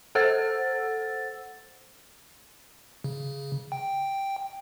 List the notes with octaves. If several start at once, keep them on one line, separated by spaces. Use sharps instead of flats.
A4 C5 F#5 E6 A6
C#3
G5